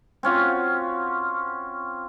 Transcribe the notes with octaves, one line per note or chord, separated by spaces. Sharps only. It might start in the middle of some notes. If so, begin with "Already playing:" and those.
C4 C#4 F4 F#4